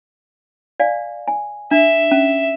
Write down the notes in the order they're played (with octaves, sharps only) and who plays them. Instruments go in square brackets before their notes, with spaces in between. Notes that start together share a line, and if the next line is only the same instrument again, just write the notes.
[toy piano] D5 F5 G#5
G#5
[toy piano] D4 [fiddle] E5
[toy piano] C#4